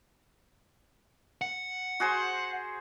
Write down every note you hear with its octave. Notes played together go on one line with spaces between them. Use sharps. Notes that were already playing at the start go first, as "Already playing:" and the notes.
F#5
F#4 G#4 C5